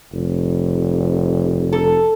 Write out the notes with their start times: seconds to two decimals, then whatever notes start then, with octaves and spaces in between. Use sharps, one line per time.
0.13 F1
1.72 A4